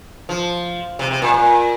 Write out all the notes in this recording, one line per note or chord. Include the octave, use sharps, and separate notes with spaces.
F3
C3
C3
A#2
A#2